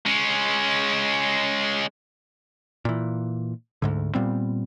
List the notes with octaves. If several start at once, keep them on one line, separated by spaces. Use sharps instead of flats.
G#3 C#4
A#2 E3
D2 G#2 D3
A#2 G3 B3 C4